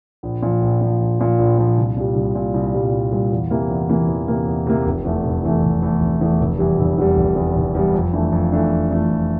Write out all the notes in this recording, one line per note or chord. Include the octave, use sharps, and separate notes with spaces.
A#1
A#2 F3
A#1
A#2 F3
A#1
A#2 F3
A#1
A#2 F3
C2
A#2 G3
C2
A#2 G3
C2
A#2 G3
C2
A#2 G3
E2
C3 E3 A#3
E2
C3 E3 A#3
E2
C3 E3 A#3
E2
C3 E3 A#3
F1
E2 E3 A3
F1
E2 E3 A3
F1
E2 E3 A3
F1
E2 E3 A3
F1
E2 E3 G3
F1
E2 E3 G3
F1
E2 E3 G3
F1
E2 E3 G3
F2
E3 A3 D4
F2
E3 A3 D4
F2
E3 A3 D4
F2